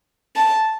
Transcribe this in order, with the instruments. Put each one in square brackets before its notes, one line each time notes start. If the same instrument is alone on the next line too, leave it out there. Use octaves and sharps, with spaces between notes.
[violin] A5